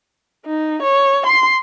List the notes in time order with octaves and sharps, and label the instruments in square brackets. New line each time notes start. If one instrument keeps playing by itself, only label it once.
[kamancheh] D#4
C#5
C6